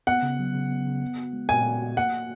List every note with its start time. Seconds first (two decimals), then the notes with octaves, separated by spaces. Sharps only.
0.07 B3 F#5
0.23 C#3
0.39 F#3
0.54 C#3
0.70 B3
0.86 C#3
1.01 B3
1.18 F#4
1.33 G#3
1.49 A#2 G#5
1.65 B3
1.81 F#4
1.96 A#3 F#5